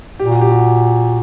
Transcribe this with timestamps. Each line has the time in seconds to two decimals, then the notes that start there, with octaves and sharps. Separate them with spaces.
0.20 A#2 G4
0.31 F#4
0.41 G4
0.51 F#4